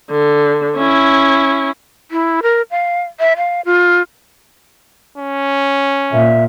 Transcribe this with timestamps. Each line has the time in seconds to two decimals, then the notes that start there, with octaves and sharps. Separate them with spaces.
0.11 D3
0.77 C#4 E4
2.11 E4
2.43 A#4
2.71 F5
3.20 E5
3.37 F5
3.65 F4
5.18 C#4
6.12 A#2 E5